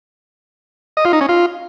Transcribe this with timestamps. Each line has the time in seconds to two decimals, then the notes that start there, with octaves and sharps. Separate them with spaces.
0.97 D#5
1.05 F4
1.13 D#4
1.21 C#4
1.29 F4